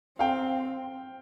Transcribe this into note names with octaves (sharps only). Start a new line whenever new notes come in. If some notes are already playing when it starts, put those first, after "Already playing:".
C4 F5 G5